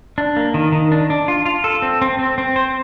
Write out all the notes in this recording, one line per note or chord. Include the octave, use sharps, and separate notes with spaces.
D4
A#3
D#3
D#3
D4
D4
F4
F4
A4
C4
C4
C4
C4
C5